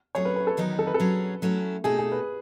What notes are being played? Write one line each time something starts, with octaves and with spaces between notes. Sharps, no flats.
F#3 A3 C#4 G#4 C#5
B4
B4
A4
E2 D#3 F#3 B3 D#4
A4
B4
A4
F#3 C#4 G#4
F#3 A3 C#4 E4
B2 A3 D#4 G#4 A4
G#4
B4